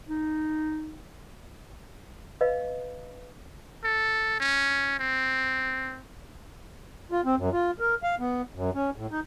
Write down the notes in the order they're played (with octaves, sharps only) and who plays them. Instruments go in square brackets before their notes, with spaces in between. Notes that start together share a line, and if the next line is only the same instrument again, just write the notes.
[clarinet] D#4
[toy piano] B4 D#5 F5
[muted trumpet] A4
C#4
C4
[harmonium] F4
C4
F#2
F4
A#4
F5
B3
F#2
C#4
A2
D#4